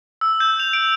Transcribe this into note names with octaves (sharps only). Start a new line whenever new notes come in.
E6
G6
F7
D7